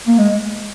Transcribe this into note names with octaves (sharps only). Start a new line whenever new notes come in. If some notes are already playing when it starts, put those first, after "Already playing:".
A#3
G#3